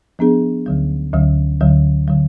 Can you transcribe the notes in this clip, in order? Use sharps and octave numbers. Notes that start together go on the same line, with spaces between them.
F3 B3 D4 G#4
D2 D3 F#3
D2 D3 F#3
D2 D3 F#3
D3 F#3